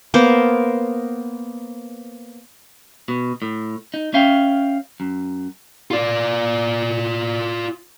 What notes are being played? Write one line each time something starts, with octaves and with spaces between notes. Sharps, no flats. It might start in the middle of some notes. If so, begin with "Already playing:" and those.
A#3 B3 A#4 C5
B2
A2
D#4
C#4 E5 F5 G5
F#2
F4 D5